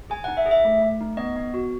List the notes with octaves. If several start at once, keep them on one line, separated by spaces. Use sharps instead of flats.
G#4 G#5
F#5
D#4
E5
G#4
E5
A3
A3
D#4
B3 D#5
B3
F#4